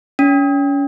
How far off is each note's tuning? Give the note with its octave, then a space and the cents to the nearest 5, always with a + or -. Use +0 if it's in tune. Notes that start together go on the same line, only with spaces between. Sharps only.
C#4 +30